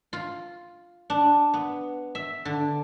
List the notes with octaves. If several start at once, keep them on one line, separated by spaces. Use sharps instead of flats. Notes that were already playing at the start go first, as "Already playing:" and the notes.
F4
D4
B3
E5
D3